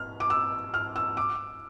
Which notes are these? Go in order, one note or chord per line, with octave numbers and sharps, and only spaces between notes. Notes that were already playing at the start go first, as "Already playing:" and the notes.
Already playing: F6
D6
E6
F6
E6
D6